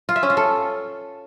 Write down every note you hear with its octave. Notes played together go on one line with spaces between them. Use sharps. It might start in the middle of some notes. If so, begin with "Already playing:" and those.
F4
E5
C#4
F4
A4